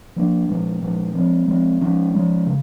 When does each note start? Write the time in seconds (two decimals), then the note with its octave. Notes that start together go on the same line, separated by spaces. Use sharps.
0.16 F3 A#3 D4
0.48 A#2 F3 G#3
0.82 A#2 F3 G#3
1.14 F3 G#3 C4
1.48 F3 G#3 C4
1.81 F3 G#3 C#4
2.14 F3 G#3 C#4
2.46 C#3